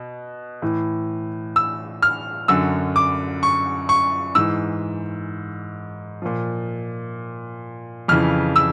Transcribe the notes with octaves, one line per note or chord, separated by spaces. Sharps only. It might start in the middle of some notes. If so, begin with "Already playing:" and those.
Already playing: B2
A2 E3
E6
F6
F#2 D3 F#3 E6
D6
C#6
C#6
G#2 E3 E6
A#2 F3
F2 C#3 E3 F6
E6